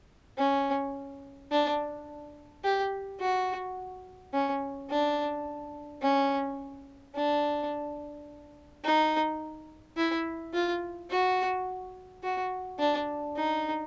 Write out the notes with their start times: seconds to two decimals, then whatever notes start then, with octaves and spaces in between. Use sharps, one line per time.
0.38 C#4
1.51 D4
2.64 G4
3.20 F#4
4.34 C#4
4.89 D4
6.02 C#4
7.15 D4
8.84 D#4
9.97 E4
10.53 F4
11.10 F#4
12.23 F#4
12.79 D4
13.36 D#4